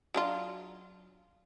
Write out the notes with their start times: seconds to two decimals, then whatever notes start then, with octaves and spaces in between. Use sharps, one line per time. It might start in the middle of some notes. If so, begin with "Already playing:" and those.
0.14 F#3 D4 F4